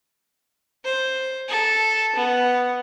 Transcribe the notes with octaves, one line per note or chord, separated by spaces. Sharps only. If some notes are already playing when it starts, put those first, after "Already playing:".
C5
A4
B3